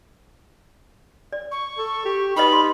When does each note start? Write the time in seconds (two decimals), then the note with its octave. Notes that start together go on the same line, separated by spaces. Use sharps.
1.33 D5
1.52 C#6
1.78 A4
2.05 G4
2.36 D#4 G4 B4 D#5 B5
2.53 C6